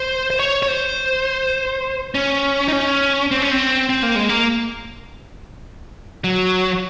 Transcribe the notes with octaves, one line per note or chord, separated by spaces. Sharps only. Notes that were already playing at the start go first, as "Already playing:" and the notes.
Already playing: C5
C5
C#5
C#5
C5
C#4
D#4
C#4
C4
C#4
C4
C4
A#3
G#3
A#3
F#3